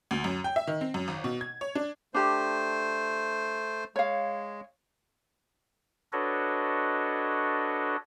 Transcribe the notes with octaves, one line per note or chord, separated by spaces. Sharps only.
D2
F#2
G5
E5
D#3
C4
F#2
G#1
B2
G#6
C#5
D4
A3 D4 G4 C5
G#3 C#5 F5
D4 F#4 A4 B4 C#5 D#5